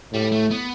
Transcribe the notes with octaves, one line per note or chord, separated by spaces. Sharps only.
A2 G3
A3
B3